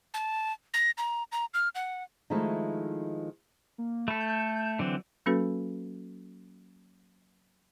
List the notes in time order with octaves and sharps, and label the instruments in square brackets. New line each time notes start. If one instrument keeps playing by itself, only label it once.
[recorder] A5
A#6
A#5
A#5
F6
F#5
[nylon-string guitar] D#3 F3 G#3 A3 D#4 E4
[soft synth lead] A#3
[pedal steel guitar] A3 A4 [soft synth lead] B5
[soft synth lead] G6
[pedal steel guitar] D3 E3 C4 [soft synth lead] F#3
[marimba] F#3 A#3 C#4 F#4 A4 B4